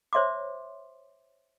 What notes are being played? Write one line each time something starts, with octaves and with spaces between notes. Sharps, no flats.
C5 C#5 E5 C6 D6